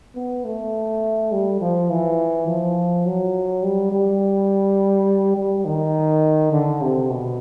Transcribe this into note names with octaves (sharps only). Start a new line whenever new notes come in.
B3
A3
G3
F3
E3
F3
F#3
G3
G3
G3
D#3
D3
C3
B2